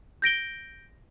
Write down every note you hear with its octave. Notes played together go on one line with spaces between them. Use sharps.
G6 A#6 D7 G7